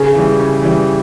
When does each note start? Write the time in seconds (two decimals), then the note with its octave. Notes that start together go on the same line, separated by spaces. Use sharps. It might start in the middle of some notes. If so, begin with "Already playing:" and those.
Already playing: C#3 G#4
0.15 E3 G3
0.39 C#3
0.63 E3 G3